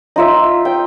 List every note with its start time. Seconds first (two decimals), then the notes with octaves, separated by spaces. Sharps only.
0.16 D#4 F4 E5
0.65 G5